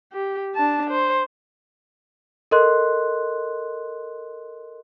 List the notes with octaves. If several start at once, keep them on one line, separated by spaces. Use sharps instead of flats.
G4
D4 A5
C5
A4 A#4 D#5 C6 F#6